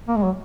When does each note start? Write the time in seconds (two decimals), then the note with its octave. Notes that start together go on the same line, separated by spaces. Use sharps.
0.08 A#3
0.17 G#3
0.23 F#3